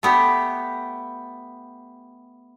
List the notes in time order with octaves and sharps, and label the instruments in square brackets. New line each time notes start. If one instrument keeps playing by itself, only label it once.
[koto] A3 B3 G4